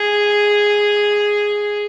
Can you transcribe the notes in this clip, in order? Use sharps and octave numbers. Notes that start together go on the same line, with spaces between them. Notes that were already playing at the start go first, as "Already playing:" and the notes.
Already playing: G#4